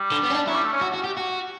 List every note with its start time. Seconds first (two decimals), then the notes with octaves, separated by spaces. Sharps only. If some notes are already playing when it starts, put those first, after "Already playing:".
Already playing: G3
0.12 D3
0.23 B3
0.30 C#4
0.34 D4
0.47 F#3 E4
0.55 G3
0.64 A3
0.73 C#4
0.81 F#4
0.94 F#4
1.05 G4
1.18 F#4